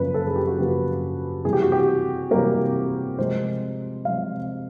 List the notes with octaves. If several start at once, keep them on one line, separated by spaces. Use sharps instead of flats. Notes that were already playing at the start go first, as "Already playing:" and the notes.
Already playing: F#2 C#3 F3 A#3 B4
A4
G#4
G4
F#4
F#2 C#3 F3 A#3 G4
C3 E3 G3 A#3 G#4
G4
F#4
G4
C3 E3 G3 A#3 A#4
C3 F3 G#3 C4 C5
C3 F3 G#3 C4 F5